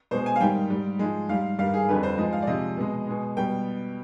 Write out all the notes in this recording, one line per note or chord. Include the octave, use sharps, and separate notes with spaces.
B2 G#3 C5
G#5
F5
G#2 D#3 G3 G5
G#2 G3
G#2 F3 G#3
G#2 G3 F5
G2 D#3 G3 F5
G#4
F2 D3 G3 B4
C5
G#2 F3 G#3 D#5
F5
D5
C3 F3 G#3 D#5
B2 G#3
B2 G#3
B2 G3 G5